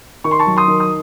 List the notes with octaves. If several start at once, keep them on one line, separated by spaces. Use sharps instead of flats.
D#3 C#6
C6
A5 C#6
F#3
C6 D#6
D#3
D#6